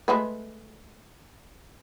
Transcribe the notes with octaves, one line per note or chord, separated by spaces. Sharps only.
G#3 A3 B4